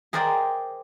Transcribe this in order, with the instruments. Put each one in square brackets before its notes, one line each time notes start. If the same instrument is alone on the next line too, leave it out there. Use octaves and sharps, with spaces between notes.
[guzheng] G#4 A#4 C5 D5 D#5 G5